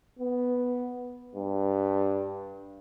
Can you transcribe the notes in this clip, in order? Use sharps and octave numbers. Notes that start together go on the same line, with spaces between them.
B3
G2